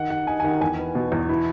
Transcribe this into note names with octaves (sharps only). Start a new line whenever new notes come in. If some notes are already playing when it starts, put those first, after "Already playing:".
Already playing: D#3 F#5
D#3 F#5
D#4 G#5
G#5
D#3 F#5
E2 G#5
B3
B2
E2
E4